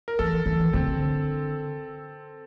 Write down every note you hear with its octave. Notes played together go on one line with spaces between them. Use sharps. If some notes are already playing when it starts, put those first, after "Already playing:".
A#4
E3 A4
E3
D3 C4